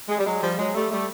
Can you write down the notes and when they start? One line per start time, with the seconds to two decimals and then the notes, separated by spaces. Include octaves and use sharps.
0.09 G#3
0.18 G3
0.26 F#3 G#3
0.42 F3 G3
0.58 F#3 G#3
0.75 G3 A3
0.91 G3 A3